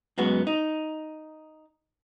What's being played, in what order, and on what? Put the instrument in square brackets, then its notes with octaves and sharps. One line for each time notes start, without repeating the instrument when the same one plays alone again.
[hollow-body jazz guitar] F#2 G#3 B3 F#4
D#4